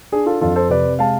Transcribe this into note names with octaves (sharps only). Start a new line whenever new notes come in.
D4 G#4
F4 A4
F2 F4 A4
A4 C5
C3 B4 D5
G#3 F5 A5